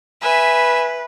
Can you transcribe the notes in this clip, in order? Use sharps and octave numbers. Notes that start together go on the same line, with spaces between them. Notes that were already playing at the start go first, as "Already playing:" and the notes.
B4 E5 G#5